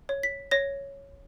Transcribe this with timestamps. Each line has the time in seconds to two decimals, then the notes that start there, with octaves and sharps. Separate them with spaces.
0.09 C#5
0.23 B6
0.51 C#5 A#6